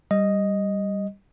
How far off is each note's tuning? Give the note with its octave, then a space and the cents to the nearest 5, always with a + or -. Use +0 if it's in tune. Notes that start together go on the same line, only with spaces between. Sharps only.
G3 +0 D#5 +0